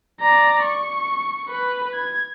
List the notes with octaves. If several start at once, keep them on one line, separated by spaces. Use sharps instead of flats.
D5 A#5
C#6
B4
G#6